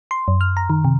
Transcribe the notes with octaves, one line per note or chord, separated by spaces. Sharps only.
C6
F#2
F6
A#5
D#3
C3